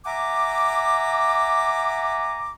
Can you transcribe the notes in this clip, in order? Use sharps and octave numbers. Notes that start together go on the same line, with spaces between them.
E5 F#5 G#5 A#5 D6